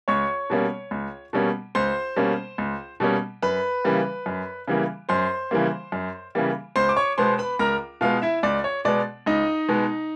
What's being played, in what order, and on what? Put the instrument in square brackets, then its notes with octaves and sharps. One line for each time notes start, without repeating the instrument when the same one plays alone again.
[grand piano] C#2 C#5 C#6
B2 G3 A#3 C#4
C#2
B2 G3 A#3 C#4
C#2 C5 C6
B2 G3 A#3 C#4
C#2
B2 G3 A#3 C#4
F#2 B4 B5
C#3 E3 G3 A#3
F#2
C#3 E3 G3 A#3
F#2 C5 C6
C#3 E3 G3 A#3
F#2
C#3 E3 G3 A#3
C#2 C5 C6
D6
C#5 C#6
B2 G#3 B3 C5 C6
B4 B5
C#2 A#4 A#5
B2 G#3 B3 F4 F5
E4 E5
C#2 D5
C#5
B2 G#3 B3 D5
C#2 D#4 D#5
B2 G#3 B3